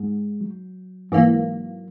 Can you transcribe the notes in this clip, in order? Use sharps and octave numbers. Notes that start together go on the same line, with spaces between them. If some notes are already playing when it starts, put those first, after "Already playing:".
Already playing: G#2 G#3
F#3
G#2 E3 F#3 A#3